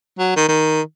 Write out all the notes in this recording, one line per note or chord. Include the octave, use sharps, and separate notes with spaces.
F#3
D#3
D#3